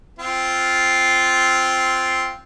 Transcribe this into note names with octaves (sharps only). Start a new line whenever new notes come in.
C4 F4